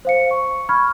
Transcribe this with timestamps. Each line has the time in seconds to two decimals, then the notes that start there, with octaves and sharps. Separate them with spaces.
0.05 C5 F5 C#7
0.31 C#6
0.69 B5 C#6 F6 G#6